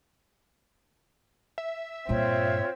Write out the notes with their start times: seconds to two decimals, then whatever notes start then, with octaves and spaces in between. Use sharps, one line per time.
1.58 E5
2.09 G2 A#2 C4 F4 C#5